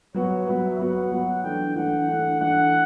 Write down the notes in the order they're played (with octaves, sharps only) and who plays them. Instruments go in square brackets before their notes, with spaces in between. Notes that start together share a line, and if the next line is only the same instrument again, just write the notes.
[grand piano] F#3 B3 F#4 B4 [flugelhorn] C#5
[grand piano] F#3 B3 F#4 B4 [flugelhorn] E5
[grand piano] F#3 B3 F#4 B4 [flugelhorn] F#5
[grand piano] F#3 B3 F#4 B4
[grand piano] E3 A3 D4 [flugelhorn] G5
[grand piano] E3 A3 D4 [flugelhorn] F#5
[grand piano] E3 A3 D4
[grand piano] E3 A3 D4 [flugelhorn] F#5